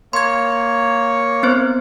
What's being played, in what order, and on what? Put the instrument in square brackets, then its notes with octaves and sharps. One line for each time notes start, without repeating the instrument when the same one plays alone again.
[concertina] A#3 C#5 [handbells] C6 G#6
[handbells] B3 C4 C5